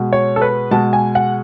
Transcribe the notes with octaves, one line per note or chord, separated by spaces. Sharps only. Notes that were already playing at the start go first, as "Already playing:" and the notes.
Already playing: B2 G#3
C#5
A4
B4
B2 G#3 A5
G#5
F#5